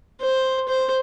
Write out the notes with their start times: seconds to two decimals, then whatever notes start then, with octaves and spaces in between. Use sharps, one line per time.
0.21 C5
0.68 C5